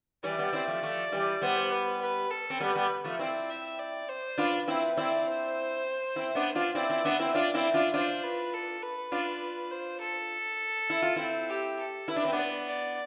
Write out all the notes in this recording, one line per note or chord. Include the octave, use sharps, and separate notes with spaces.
E3 G3 D5
G3 B3
C4 E4
F3 A3
F3 A3
E3 G3
G3 B3 C5
B4
B4
A4
C4
G3 B3 B4
G3 B3
F3 A3
C4 E4 D5
E5
D5
C5
D4 F4 B4
C4 E4
C4 E4 D5
C5
C4 E4
B3 D4
D4 F4
C4 E4 D5
C4 E4
B3 D4 E5
C4 E4
D4 F4 D5
C4 E4
D4 F4
D4 F4 C5
B4
A4
B4
D4 F4
C5
A4
E4
F4
C4 E4
G4
A4
E4 B4
D4
C4
B3 D4
D5
D5